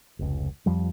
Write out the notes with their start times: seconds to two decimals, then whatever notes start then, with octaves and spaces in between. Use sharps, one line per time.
0.19 F1 C#2
0.66 F2 F3 G3